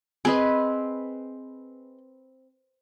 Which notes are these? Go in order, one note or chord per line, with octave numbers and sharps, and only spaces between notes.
C4 G#4 B4 D#5